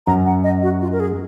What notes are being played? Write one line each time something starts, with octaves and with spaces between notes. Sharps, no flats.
F#2 A#5
F#5
D#5
F#4
F4
A#4
G#4